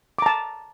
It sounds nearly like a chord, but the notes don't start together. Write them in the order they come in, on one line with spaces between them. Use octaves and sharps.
D6 A#5 A5